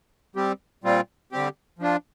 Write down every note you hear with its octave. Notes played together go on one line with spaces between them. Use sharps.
G3 C4 G4
A#2 G3 C4 F4
D3 G3 C4 G4
F3 D4 F4